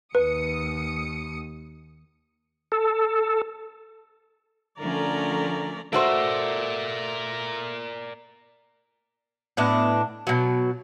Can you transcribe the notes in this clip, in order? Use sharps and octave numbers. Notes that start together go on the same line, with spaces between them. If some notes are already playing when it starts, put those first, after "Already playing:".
D#2 B4 D#6 C#7
A4
D3 F3 A3 C#4 A#4 D5 A#5
A3 F#4 A#4 C5 D5
A2 B3 D4 D#5
B2 F#3